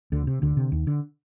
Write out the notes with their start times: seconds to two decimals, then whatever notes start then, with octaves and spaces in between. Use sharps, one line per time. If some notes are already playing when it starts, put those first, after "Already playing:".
0.12 D2 D3
0.27 C3
0.42 D2 D3
0.57 C3
0.72 D#2
0.87 D3